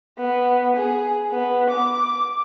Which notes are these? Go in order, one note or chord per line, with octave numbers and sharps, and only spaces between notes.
B3
G#4
B3
D6